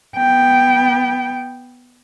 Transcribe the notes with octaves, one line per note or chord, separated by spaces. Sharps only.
B3 G5